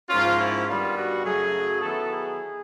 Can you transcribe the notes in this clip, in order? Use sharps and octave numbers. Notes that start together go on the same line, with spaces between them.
G#2 F3 A#3 C#4 F4
E4
G2 D#3 G3 B3 F4
F#4
F#2 C#3 F#3 A3 G#4
D#3 F#3 B3 E4 A4
G#4